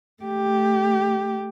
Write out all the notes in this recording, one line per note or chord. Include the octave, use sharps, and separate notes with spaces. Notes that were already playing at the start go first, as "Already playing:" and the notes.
A3 G4